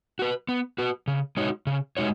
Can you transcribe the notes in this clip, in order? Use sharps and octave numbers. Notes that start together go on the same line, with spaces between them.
F#4 B4
B3
F#4 B4
C#3
G#3 D#4 F#4 C#5
C#3
G#3 D#4 F#4 C#5